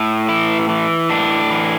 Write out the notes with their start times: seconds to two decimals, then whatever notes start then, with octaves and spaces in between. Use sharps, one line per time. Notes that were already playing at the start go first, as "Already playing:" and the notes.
Already playing: A2
0.29 E3 E4
0.69 E3
1.10 A2 D4
1.51 E3